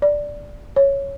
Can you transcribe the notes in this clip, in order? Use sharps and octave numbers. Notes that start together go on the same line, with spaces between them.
D5
C#5